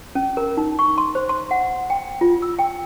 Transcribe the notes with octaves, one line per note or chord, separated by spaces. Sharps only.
C#4
A#4
D#4
C#6
C6
C5
C6
F#5
G5
F4
E6
G5